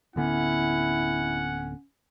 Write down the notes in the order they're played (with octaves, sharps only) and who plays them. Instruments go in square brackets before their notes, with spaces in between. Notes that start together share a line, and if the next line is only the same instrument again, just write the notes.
[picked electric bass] D1 D3 B3 [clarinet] C#4 [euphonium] E4 [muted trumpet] F#5